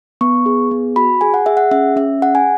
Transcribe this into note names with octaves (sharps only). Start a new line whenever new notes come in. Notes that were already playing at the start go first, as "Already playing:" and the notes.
B3 C#6
G#4
B3
F#4 B5
G#4 G#5
F#5
G#4 E5
F#5
C#4 E5
C#4 E5
G#4 F#5
G#5